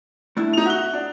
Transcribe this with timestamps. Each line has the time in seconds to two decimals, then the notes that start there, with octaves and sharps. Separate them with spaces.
0.37 A3 D4 E4
0.53 D#4 F7
0.66 F#4 E5 F#6 G7
0.93 D4